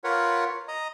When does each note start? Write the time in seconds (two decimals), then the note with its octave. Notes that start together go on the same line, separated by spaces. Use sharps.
0.04 F4 A#4 B4 C#5 F#5
0.68 D#5 A#5